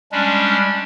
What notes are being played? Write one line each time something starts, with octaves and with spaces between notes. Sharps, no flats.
G3 G#3 C#4 D4